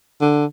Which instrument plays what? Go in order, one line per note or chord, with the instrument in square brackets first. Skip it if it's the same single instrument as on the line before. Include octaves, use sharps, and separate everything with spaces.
[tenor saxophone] D3